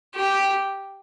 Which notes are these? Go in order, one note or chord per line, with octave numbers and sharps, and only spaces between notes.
G4